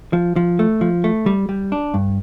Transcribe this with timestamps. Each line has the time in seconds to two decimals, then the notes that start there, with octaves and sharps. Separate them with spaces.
0.13 F3
0.36 F3
0.59 A3
0.81 F3
1.04 A3
1.26 G3
1.49 G3
1.72 D4
1.94 G2